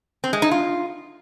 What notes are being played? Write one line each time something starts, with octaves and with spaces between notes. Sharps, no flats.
C4
G#3
D#4
F4